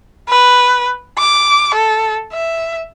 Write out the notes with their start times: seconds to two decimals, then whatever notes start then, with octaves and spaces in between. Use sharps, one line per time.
0.29 B4
1.18 D6
1.74 A4
2.33 E5